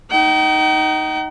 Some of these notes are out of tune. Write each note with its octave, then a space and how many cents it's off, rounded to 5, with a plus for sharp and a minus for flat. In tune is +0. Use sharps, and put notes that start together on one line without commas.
D#4 +0 G5 -45